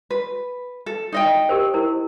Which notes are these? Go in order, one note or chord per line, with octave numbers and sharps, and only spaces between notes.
B4
A4
D#4 D#5 G5
G4 A#4 C5
E4 A#4 C5